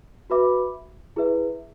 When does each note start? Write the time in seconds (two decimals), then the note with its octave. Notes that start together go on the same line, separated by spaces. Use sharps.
0.30 F#4 B4 E5 B5 D6
1.16 E4 G#4 B4 E5